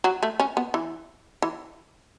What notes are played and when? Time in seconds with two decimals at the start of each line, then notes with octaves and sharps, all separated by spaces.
0.04 F#3
0.23 A3
0.40 C#4
0.57 B3
0.74 E3
1.42 E3